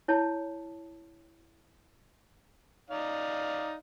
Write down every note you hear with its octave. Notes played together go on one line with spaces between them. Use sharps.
E4 C#5 A5
D#4 D5 F5